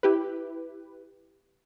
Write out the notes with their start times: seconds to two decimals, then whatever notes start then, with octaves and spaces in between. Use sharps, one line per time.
0.03 E4 G4 B4